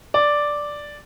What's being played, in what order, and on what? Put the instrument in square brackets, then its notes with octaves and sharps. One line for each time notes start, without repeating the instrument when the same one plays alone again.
[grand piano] D5